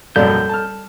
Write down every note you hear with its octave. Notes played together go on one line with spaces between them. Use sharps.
A#1 F#2 B2 G3 A4 D5 G6
A5 F6